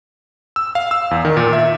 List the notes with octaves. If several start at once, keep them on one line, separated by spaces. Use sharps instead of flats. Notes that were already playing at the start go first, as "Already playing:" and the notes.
E6
F5
E6
E2
D#3
A#2
E5